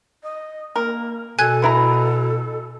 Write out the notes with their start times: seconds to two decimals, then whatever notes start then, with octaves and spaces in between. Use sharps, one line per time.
0.23 D#5
0.76 A#3 A#4
1.39 B2 A4 G#5 F#6 G#6
1.62 B3 E4 A#5